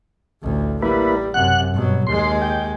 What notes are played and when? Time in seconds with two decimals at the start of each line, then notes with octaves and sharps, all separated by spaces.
0.42 A1 D2
0.82 G3 A#3 E4 B4
1.34 F#2 C3 F#5 F#6
1.74 G2 B2 F#3
2.07 D#2 G#3 C6
2.42 G5